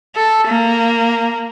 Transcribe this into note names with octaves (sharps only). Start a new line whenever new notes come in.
A4
A#3